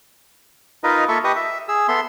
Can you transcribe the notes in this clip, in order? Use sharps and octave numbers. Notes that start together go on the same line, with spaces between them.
D#4 F4 A#4 B4 D#5
A#3 F4 A4 E5 C#6
G4 B4 D#5 C#6 D#6
E5
G#4 E6
B3 A4 E5 C6